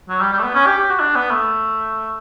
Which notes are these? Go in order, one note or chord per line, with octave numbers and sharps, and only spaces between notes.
F#3
G3
G3
A3
B3
C#4
G4
G4
F#4
D4
B3
A3